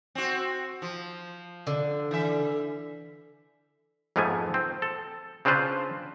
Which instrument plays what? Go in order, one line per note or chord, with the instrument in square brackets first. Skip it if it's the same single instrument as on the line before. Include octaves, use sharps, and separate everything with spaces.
[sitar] C4 F#4
F3
[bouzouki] D3
[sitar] E3 E5
[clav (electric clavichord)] F2 G#2 F3 A3 B3 G#5
C4
A4
C#3 C4 D4 F4 B4 C5